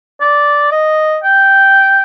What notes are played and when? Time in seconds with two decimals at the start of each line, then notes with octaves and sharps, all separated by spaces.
0.21 D5
0.72 D#5
1.23 G5